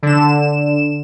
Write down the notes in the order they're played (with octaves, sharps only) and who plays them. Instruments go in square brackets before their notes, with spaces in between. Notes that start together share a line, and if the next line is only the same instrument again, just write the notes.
[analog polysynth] D3 E7